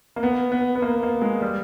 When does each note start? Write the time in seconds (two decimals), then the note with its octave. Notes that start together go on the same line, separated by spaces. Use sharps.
0.16 A#3
0.23 B3
0.52 B3
0.75 B3
0.82 A#3
1.03 A#3
1.22 G#3
1.42 G3